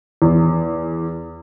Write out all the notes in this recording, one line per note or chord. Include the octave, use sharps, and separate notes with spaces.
E2